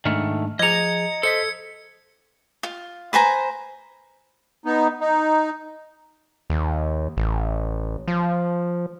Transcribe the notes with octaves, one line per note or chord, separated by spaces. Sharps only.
G#2 D#3 A3 D4 F6
F3 G#4 D#5 A#5 G#6 C#7
A4 C5 D#5 B6 C#7
F4
B4 C5 G#5 A#5
B3 D#4
D#4
D#2
A1
F3